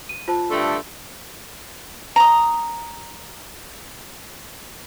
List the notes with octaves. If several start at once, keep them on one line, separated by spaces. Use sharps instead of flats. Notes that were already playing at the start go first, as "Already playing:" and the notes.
D#7
F4 C5 A5
G2 D3 A3
A#5 D#6